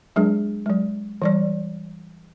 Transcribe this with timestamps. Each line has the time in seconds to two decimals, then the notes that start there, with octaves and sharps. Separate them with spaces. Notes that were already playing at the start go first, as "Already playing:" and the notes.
0.16 F#3 G#3 D4 G#4
0.66 F#3 G#3
1.22 E3 G3 D5